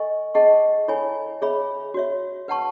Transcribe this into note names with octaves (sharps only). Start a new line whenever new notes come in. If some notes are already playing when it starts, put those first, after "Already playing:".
Already playing: A4 D#5 G#5 C#6
G#4 D#5 F#5 A5 C#6
E4 A4 C#5 G#5 B5
G#4 C#5 E5 B5
F#4 C#5 E5
B4 F#5 A5 C#6